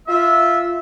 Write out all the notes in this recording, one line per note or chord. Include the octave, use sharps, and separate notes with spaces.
F4 E5